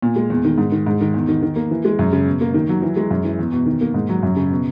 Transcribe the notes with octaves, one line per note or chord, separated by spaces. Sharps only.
A#2
G#3
E2
D#3
G#2
D#3
G#2
D#3
E2
D#3
D#3
A#3
E3
G#3
F#2
C#3
B2
A#3
D#3
F#3
E3
G#3
F#2
E3
E2
B2
D#3
A#3
G#2
F#3
F#2
C#3
B2